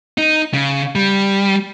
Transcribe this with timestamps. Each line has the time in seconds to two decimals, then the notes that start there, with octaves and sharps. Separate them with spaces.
0.18 D#4
0.54 C#3
0.95 G3